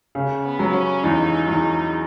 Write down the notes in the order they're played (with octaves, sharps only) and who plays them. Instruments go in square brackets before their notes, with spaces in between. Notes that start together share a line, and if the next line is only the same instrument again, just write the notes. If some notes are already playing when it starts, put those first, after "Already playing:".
[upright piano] C#3
[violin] B3
[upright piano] F#3
[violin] C#4
[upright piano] E2 [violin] D#4
[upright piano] E2 [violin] D#4